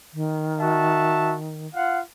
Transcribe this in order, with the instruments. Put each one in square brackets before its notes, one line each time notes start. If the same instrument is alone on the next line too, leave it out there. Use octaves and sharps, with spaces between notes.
[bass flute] D#3
[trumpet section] F#4 E5 A5
F4 F5 F#5